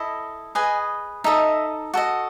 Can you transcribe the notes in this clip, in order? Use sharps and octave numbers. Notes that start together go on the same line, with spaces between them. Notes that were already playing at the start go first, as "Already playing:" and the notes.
Already playing: E4 A4 D#5
G#4 B4 D#5 G#5
D#4 A4 D#5 E5
F#4 A4 D#5